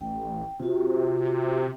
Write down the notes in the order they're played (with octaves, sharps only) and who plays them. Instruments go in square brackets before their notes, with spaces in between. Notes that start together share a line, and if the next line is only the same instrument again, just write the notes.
[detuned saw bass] A1 [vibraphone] G5
[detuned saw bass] C3 [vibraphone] F4 F#4